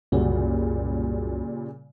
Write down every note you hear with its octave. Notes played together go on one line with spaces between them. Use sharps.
C2 F#2 A#2 C#3 G3 F#4